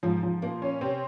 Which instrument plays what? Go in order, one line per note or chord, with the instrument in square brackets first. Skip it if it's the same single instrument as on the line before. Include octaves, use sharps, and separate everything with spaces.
[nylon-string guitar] G#2 [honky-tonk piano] F3
[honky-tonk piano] F3
[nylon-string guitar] A#2 [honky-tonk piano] A#3
[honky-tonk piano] C#4
[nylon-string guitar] C3 [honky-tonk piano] C4